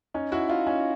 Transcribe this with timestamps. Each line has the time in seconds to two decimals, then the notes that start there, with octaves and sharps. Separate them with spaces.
0.14 C#4 D#4
0.32 E4 F#4
0.49 D#4 F4
0.67 C#4 D#4